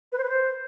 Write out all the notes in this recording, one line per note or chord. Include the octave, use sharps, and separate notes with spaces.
B4
C5
B4
C5